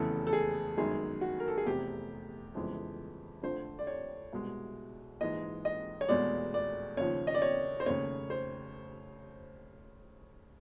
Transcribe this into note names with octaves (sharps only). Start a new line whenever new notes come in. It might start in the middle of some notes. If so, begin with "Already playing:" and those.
Already playing: F1 E2 C#3 E3 A4
A4
G#4
G1 F#2 D#3 G#3 G#4
F#4
A#4
A4
G#4
F1 E2 C3 G4
G1 F2 C#3 E3 G#3
F2 D3 F3 A3 C5
D5
C#5
C2 B2 G#3
A#1 G#2 E3 G#3 D#5
D#5
C#5
F1 E2 B2 G#3 D5
D5
D#2 C#3 F3 C#5
D#5
D5
C#5
C5
F1 D#2 C#3 C#5
C5